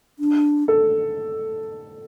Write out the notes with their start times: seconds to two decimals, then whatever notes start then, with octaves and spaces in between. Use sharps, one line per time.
0.19 D4
0.68 A4